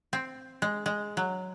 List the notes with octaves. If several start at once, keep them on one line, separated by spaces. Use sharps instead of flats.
C4
G#3
G#3
F#3